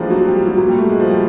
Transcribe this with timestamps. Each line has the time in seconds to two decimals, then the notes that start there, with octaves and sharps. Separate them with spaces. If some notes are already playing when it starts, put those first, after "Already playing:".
Already playing: A2 E3 F3 G3 G#3 A#3 D4
0.10 F#3
0.26 G3
0.36 G3
0.47 F#3
0.58 A#2 F#3
0.68 G3
0.79 A3
0.89 G#3
1.00 F3
1.10 G3